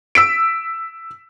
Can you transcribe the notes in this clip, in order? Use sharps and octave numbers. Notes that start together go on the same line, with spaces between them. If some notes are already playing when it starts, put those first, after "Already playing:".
E6 B6 D7